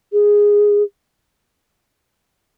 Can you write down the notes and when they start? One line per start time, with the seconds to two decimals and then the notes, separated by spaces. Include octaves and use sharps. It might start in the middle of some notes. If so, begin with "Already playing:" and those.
0.13 G#4